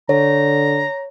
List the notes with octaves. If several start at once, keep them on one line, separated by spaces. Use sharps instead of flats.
D3 C#5 A#5